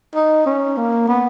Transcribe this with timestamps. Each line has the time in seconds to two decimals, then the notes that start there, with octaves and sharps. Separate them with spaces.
0.15 D#4
0.46 C#4
0.77 A#3
1.08 B3